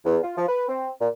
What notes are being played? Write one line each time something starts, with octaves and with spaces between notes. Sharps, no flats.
E2
F4
F3
B4
C4
A#2